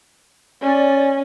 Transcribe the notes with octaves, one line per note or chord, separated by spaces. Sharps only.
C#4 D5